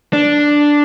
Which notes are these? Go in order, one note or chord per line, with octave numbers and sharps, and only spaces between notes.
D4